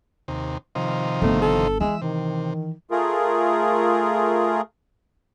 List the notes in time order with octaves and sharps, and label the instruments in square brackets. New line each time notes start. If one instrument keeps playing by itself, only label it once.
[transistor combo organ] D#2 C3
C3 D#3 F3
[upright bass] G1 [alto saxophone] A3
[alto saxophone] A4
[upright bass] E3 [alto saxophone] G#3 [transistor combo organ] E5
[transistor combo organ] C3 [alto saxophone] D#3
[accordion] A3 F4 G#4 A#4